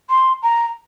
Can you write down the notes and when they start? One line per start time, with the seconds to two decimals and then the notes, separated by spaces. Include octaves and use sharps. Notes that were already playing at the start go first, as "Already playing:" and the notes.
0.10 C6
0.43 A#5